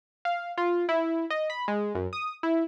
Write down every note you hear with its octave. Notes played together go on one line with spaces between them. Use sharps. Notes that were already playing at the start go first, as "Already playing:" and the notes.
F5
F4
E4
D#5
B5
G#3
F#2
D#6
E4